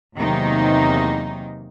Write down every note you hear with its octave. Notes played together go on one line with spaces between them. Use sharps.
E2 C3 D#3 F#3 A#3 D#4